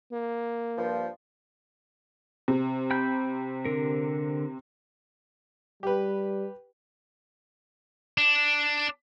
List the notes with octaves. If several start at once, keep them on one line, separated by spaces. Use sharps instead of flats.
A#3
G2 F3
C3
G5 B5 G6
D3 A#4
G3 G4 B4
D4